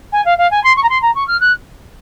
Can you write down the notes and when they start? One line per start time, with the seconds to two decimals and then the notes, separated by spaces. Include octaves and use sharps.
0.12 G#5
0.25 F5
0.38 F5
0.51 G#5
0.64 C6
0.76 C#6
0.83 A#5
0.89 C6
1.02 A#5
1.15 C#6
1.27 F6
1.40 F#6